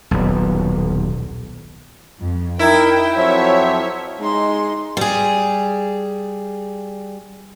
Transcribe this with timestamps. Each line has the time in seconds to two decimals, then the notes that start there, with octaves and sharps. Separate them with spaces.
0.11 D#1 B1
2.21 F2
2.59 D#4 E4 A#4 G5
3.16 F2 F3 F#3 C#5 E5
4.20 G#3 D#4 C6
4.97 G3 G#4